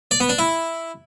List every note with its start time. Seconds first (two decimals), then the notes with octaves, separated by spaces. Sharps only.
0.11 D5
0.20 B3
0.29 D4
0.39 E4